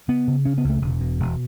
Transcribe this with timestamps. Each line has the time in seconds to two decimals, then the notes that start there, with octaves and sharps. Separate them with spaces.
0.08 C#3 B3
0.27 C#3
0.45 C#3 C#4
0.58 B3
0.64 C#2
0.69 A3
0.82 E1
1.01 B2
1.19 E1